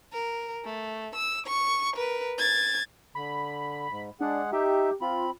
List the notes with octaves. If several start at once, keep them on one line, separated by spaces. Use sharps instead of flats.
A#4
A3
E6
C#6
A#4 B4
G#6 A6
D3 B5
G#2
G#3 D4 G#4 F#5
D#4 G4 E5
C4 F4 B5